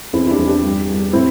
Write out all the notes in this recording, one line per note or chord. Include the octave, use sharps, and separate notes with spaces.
E2 C4 E4
E4
D4 G4
E2
D4 G4
G2
G2
A2 C4 E4